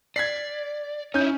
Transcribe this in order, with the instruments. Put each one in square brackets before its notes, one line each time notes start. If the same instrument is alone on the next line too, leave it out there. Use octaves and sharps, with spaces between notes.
[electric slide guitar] D5 [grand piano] G#6 B6 C7
[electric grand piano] C#4 G6 [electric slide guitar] D#4 E4